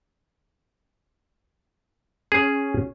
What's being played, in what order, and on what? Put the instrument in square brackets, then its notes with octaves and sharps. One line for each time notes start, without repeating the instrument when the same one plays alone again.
[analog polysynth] C#4 [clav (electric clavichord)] G#4